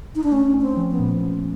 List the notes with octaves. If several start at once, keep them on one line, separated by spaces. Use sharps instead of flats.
D#4
D4
A3 C#4
C#4
C4
F3
B3
A#2